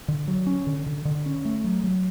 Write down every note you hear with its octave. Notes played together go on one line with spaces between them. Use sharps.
D3
F#3
C#4
D3
D3
D3
C#4
A3
F#3
F#3